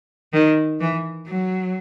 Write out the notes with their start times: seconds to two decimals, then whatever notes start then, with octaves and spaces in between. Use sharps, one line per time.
0.33 D#3
0.80 E3
1.27 F#3